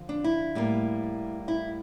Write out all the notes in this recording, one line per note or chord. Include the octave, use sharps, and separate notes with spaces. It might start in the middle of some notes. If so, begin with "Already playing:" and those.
Already playing: D3 F3
D4
E4
A2 G3 A#3
E4